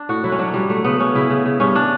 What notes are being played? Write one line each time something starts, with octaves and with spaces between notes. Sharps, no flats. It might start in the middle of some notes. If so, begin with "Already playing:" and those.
Already playing: D4
A2 F#4
F#3 E4
C#4
F#3 D4
F#3 G3
F#3 A3
C#3 B3
C#3 C#4
C#3 E4
C#3
C#3
G2 C#4
D4